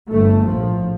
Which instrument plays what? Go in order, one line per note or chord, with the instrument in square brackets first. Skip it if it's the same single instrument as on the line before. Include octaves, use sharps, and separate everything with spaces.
[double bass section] G1 G2 A3
A#1 A2 F3